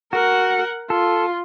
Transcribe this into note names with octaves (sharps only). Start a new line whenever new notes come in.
F#4 A#4 F#5
F4 A4